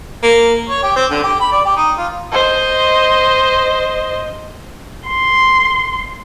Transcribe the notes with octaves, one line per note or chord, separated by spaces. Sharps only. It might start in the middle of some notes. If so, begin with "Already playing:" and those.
A#3
C#5
G4
C4
D3
G4
B5
D5
G4
D#4
F4
C5 D#5
C6